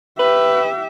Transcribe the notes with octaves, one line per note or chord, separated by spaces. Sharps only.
G4 B4 E5